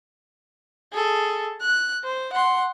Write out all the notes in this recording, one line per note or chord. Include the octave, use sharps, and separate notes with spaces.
G#4 A4
F#6
C5
F#5 C6